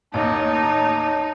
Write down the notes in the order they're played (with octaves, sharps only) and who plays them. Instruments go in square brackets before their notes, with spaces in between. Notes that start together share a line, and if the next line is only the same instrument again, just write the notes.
[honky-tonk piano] A1 D#2 [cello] D#4 [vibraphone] C#5 D6 [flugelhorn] A5